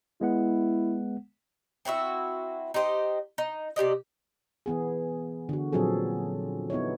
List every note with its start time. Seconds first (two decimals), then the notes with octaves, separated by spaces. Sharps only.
0.21 G#3 B3 E4 F#5
1.85 C4 E4 F#4 E5
2.74 D#4 G4 C5 D#5
3.38 D#4
3.76 C3 G4 D5 D#5
4.66 E3 B3 G#4
5.49 D3 F#4
5.72 A#2 F3 F#3 C4 G#4 A4
6.70 B3 D#4 E4 C#5